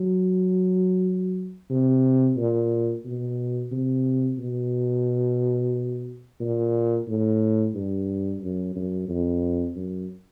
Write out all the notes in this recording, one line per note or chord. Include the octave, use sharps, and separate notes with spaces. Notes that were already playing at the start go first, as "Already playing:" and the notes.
Already playing: F#3
C3
A#2
B2
C3
B2
A#2
A2
G2
F#2
F#2
F2
F#2